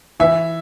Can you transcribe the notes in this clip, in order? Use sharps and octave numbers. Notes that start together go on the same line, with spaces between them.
E3 E5